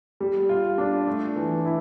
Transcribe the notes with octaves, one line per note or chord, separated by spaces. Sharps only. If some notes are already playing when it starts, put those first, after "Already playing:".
G3
F4
D4
A3
E3
E4